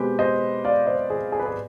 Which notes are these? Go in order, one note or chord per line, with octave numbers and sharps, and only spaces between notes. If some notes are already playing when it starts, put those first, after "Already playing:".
Already playing: B2 G#3 C4 G4 B4
C5 D#5
D5 F5
C5 D#5
G#4
G#4
B4
G#4